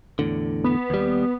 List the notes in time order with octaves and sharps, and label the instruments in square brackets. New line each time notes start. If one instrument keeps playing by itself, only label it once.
[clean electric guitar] E2 A2 D3
[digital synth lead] B3
[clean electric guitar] D#2 G3